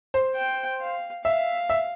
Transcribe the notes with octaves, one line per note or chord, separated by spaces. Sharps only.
C5
G5
F5
E5 F5
E5